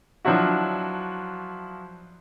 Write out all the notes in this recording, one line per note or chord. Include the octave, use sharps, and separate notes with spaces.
F3 F#3 D4 E4 F#4